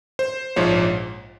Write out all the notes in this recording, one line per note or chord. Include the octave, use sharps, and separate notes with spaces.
C5
A#1 G#2 F3 C#5